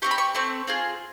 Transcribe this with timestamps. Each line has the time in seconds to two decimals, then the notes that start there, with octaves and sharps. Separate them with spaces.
0.02 C4 E4 G4 C#6
0.11 B5
0.18 C#6
0.35 A3 C4 C#6
0.67 C4 F4 G#4